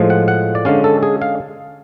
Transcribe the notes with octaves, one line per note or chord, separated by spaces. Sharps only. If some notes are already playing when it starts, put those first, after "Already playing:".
Already playing: A2 F3 G#3
F#5
F#5
D5
D3 G#3 C#4 F5
A4
G#4
F5